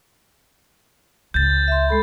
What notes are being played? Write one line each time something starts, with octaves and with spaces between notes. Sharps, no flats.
C#2 G6 A6
E5 C6
G#3 A4 B5